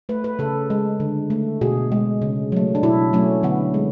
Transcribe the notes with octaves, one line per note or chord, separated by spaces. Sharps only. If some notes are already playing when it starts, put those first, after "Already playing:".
A3 B4
B4
C#3 A4
G#3
D3
A3
B2 G#4
G#3
C#3
F#3 A3
D4
B2 E4
F#3 A3 C#4
D3 B3
G#3